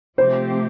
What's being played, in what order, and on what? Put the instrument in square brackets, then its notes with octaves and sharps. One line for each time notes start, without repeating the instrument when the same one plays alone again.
[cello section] C3 F3 A3 C4 G4 [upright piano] C5